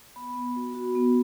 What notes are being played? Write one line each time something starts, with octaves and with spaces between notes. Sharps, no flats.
B3 B5
B3
F#4
F#4
B3